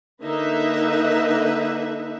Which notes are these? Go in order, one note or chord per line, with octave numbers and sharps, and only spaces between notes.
D3 A#3 D#4 B4 E5